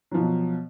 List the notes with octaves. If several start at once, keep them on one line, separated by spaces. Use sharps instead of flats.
B2 F3 F#3